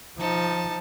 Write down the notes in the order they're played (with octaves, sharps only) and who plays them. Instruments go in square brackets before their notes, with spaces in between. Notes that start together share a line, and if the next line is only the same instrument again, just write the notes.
[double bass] F3 [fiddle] D#4 A5